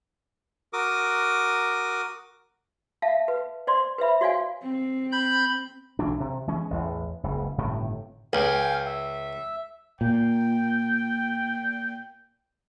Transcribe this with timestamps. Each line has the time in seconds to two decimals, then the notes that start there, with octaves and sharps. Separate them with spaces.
0.73 F#4 A#4 D6 D#6
3.02 E5 F5 A5
3.28 B4
3.67 C5 D5 C6
3.98 B4 C5 E5 B5
4.21 F#4 C#5 D5 F5 G#5
4.62 C4
5.12 B5 G6
5.99 B1 E3 F#3 D4
6.20 C3
6.47 E3 G#3 C#4
6.70 A1 E2
7.23 F#1 C#2
7.58 G1 A2 C3 D#3
8.33 C#2 F5 G5 G#5
8.86 E5
10.01 A#2 G5